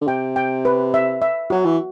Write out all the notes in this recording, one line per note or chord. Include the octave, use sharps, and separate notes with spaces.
D3
C3 G5
G5
B4
E5
E5
F#3 F#4
E3